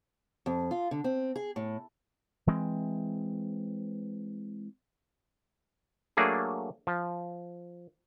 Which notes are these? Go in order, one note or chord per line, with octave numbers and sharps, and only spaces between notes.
F2
F4
D3
C4
G#4
A2
E3 G#3 C4
F#3 A3 A#3 D4 G#4
F3